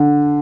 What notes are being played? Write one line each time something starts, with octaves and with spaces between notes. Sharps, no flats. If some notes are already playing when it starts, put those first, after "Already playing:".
Already playing: D3